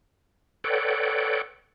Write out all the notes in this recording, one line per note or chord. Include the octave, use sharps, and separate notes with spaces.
A4 B4 C#5 D5 F#5 G5